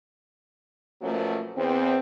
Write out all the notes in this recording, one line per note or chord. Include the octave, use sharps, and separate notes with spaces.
B2 F3 F#3 A3 A#3 C#4
E2 C4